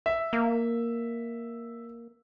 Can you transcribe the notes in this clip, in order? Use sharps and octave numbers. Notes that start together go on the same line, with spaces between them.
E5
A#3